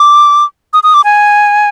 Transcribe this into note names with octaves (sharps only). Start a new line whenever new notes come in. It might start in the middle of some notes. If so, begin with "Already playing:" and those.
Already playing: D6
D#6
D#6
D6
G#5